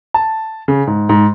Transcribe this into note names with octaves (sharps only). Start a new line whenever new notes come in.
A5
C#3
G#2
G#2